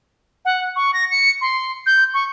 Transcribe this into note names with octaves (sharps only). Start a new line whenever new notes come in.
F#5
C#6
A#6
C#7
C6
G6
C#6